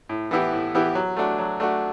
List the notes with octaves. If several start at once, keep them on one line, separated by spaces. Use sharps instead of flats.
A2
E3 B3 E4 G4
A2
E3 B3 E4 G4
F#3
A3 D4 F#4
F#3
A3 D4 F#4